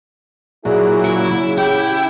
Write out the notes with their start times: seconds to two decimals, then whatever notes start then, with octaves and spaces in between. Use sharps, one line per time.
0.65 A#2 F#3 E4 G#4 D5
1.05 C#3 E4
1.58 E4 G4 G5